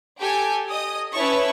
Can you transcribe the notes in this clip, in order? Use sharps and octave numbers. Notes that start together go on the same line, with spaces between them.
G4 A4 G5 G#5
D#5 D#6
C#4 E4 B4 C#5 A5 C#6